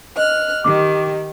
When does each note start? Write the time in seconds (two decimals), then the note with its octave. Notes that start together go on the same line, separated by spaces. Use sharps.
0.17 D#5 F6 F#6
0.64 D#3 G4 D6